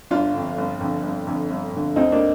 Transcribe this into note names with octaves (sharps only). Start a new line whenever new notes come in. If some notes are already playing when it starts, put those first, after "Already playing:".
G1 D4 F4
F2 D3
G1
F2 D3
G1
F2 D3
G1
F2 D3
D2 C4 D#4
A#3 D4